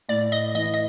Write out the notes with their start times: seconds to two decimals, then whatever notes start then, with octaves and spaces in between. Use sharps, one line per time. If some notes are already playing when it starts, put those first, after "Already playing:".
0.09 A2 D5
0.32 D#5
0.55 E3 D#5
0.74 D#5